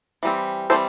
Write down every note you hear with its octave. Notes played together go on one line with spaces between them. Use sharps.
E3 G3 C4
E3 G3 C4 A4 C5